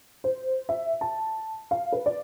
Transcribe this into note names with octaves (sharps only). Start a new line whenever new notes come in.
C5
E5
A5
F5
B4
D5